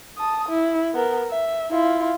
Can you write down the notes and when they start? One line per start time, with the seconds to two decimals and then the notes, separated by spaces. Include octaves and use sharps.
0.17 A5 D#6
0.49 E4
0.94 B3 A#4
1.30 E5
1.71 E4 F4